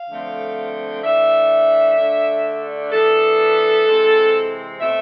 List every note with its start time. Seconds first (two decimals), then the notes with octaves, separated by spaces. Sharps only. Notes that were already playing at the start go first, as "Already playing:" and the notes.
Already playing: F5
0.09 D3 F3 A3 C4
1.03 E3 A3 D4 E5
1.98 D3 A3 D4
2.92 E3 B3 D4 A4
3.86 C3 E3 G#3 C4
4.80 B2 A3 C4 E5